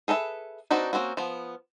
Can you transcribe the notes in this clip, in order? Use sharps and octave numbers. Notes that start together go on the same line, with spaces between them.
G#4 A4 B4 D#5 E5
C4 D4 D#4 F#4 B4
A#3 C4 C#4 F#4
F3 B3